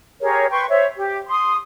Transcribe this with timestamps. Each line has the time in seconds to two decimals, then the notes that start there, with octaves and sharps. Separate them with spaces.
0.20 G4 G#4 A#4 C#5
0.50 B4 G5 C6 C#6
0.69 C5 C#5 E5
0.96 G4
1.28 C6 D#6